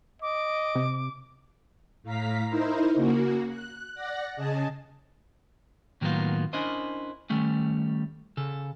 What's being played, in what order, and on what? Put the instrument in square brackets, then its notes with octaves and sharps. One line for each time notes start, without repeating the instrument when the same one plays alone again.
[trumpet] D#5 [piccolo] D6
[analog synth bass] C3
[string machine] A2 F5 A#5 B6
D#4 E4 A#4 C5
C#3 A#3 F#4
F#6
D5 F#5 F#6 A#6
C#3 G#4 D#5 A5
[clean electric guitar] A2 D#3 F#3 A#3 B3 F4
C#4 D4 E4 A#4 C5 D#5
D#3 G3 A3 C#4
C#3 A4